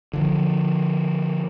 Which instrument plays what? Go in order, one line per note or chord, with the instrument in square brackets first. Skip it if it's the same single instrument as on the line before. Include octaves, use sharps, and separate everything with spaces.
[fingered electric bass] D3 F3